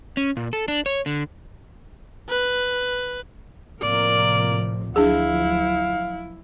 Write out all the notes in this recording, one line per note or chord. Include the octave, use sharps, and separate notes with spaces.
C#4
A#2
A4
D4
C#5
D3
B4
A2 C3 F3 A#3 A#4 D5
D2 F3 F#3 D4 E4 G#4 F5